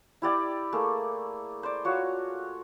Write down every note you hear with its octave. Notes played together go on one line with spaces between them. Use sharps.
E4 G4 D5 G5
A3 A#3 G#4
C5 D5
F4 F#4 C#5